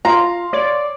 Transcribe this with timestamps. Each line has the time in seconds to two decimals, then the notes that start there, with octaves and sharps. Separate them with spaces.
0.05 F4 F5 A#5 C6
0.53 C#5 D5